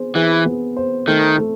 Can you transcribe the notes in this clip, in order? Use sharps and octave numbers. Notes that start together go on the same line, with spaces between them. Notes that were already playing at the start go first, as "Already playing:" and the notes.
Already playing: B3 G#4 C5
E3 G#4
B3
C5
D#3 A3
A3